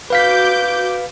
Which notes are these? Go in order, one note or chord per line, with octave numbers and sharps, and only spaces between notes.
F#4 B4 F5 D6 G6 B6